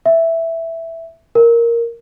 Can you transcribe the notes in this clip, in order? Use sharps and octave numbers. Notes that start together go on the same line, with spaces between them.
E5
A#4